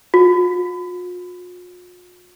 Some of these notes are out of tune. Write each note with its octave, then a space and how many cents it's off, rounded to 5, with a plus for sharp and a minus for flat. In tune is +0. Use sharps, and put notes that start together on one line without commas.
F4 +45